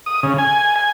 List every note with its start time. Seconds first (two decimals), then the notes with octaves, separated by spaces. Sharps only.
0.06 D#6
0.23 C#3
0.38 G#5
0.76 G#5